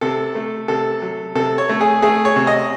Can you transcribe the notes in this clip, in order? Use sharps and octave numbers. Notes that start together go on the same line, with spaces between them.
C3 A4
A3
C3 A4
F#3
C3 A4
C#5
A3
G#4
A3 G#4
C#5
C3
D#5